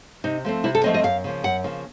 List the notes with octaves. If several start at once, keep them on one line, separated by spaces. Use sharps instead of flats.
C3 D#4
F3 A3 C4
C3 E4
A4
F3 A3 C4 D#5
D#5
F#2 F5
C#3 F3 A#3
F#2 F#5
C#3 F3 A#3